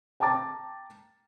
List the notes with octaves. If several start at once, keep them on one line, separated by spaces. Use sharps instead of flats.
G5 A5 A#5 D6 A6